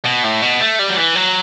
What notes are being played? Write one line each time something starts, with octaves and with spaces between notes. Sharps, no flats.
B2
A2
B2
A3
G3
F#3
E3
F#3